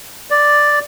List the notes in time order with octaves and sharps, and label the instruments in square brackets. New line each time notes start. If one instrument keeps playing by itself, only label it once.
[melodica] D5